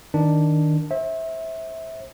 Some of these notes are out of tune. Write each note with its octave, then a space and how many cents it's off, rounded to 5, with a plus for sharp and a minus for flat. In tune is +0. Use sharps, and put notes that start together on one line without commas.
D#3 +0 D4 +0
C5 +40 E5 -15